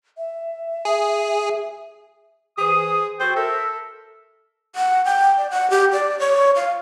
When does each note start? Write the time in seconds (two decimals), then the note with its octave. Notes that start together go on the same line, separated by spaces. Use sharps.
0.17 E5
0.85 G#4
2.58 E3 G#4 C5 D#6
3.20 F#4 A4 C5 G5
3.36 A4 A#4 E5
4.76 F#5
5.05 G5
5.38 D5
5.50 F#5
5.70 G4
5.93 D5
6.20 C#5
6.56 F5